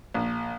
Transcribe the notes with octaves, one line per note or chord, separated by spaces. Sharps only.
A#1